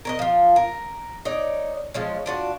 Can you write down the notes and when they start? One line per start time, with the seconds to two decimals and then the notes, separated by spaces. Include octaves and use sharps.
0.05 A#4 C#5 D#5
0.19 F3 F4
0.56 A#4
1.25 D#4 C#5 D5
1.94 F3 G#3 C#4
2.26 D4 F4 F#4